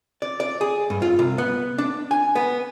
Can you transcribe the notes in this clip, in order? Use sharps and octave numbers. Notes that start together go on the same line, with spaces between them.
D5
D5
G#4
G2
F4
C2
B3
D4
G#5
B3